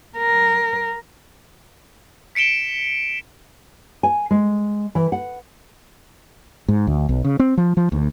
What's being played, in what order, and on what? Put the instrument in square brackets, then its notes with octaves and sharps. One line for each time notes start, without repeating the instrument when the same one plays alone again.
[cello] A#4
[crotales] B6 C#7 D7 E7 G7
[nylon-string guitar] G#5
G#3
E3
F#5
[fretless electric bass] G#2
D2
B1
C#3
C4
F3
F3
D2